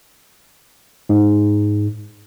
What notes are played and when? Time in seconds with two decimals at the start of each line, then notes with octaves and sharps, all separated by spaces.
1.09 G#2